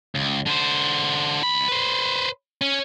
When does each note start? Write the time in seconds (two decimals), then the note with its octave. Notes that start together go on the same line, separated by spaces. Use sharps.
0.15 C#2
0.46 D3 C5
1.42 C#2 B5
1.68 B4 C5
2.61 C#4